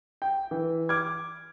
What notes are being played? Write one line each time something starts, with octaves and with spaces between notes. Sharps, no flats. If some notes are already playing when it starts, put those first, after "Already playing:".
G5
E3
D6 F6 G#6